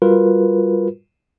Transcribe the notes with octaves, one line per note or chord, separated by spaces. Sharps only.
G3 F4 F#4 A#4 B4